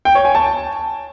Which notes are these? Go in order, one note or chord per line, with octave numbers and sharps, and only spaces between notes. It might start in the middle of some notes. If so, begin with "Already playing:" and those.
G5
C#5
G#5
A5